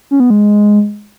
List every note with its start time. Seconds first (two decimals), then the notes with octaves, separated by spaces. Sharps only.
0.11 C#4
0.20 B3
0.30 G#3